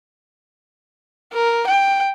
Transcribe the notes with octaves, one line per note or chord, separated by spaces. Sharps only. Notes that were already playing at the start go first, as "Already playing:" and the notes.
A#4
G5